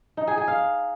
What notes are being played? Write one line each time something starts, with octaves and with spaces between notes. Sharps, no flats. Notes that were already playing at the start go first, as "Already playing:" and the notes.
D#4
G#4
G#4
F5